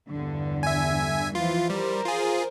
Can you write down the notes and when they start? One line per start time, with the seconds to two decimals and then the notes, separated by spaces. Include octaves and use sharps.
0.11 E2 G2 D3
0.63 E5 G#5
1.35 E3 F3 F4
1.70 G3 A#4 C5
2.05 F4 G#4